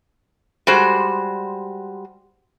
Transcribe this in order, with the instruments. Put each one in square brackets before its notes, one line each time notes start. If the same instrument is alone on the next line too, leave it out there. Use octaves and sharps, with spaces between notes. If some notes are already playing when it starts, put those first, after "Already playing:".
[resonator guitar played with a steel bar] G3 G#3 F#4 C5